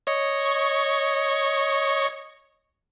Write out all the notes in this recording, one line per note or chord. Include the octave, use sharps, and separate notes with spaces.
C#5 D#5 C#6